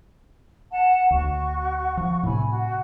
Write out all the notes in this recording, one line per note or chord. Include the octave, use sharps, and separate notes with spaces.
F#5 A5
D2 F#4 C#6
F3
A2 C3 G#5 B5
F#4